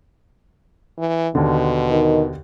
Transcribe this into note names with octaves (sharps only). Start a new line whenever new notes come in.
E3
D#2 B2 D3
D#3